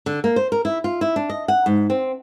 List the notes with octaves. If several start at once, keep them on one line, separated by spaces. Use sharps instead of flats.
D3
A#3
C5
A#4
E4
F4
E4
D4
D#5
F#5
G#2
C4